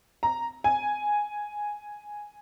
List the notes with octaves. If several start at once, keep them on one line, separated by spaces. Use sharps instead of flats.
A#5
G#5